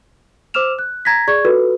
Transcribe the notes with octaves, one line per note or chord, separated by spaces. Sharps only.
C5 D6 E6 F6 E7 F7
F#6
A#5 G#6 A#6 B6
G#4 D5 C#6 G#6
F4 F#4 A4 B4